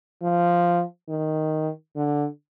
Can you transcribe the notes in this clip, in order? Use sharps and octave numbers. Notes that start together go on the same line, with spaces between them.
F3
D#3
D3